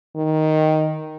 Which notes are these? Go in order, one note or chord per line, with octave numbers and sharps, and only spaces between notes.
D#3